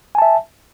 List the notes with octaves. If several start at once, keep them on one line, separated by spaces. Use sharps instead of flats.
E5 G#5 A5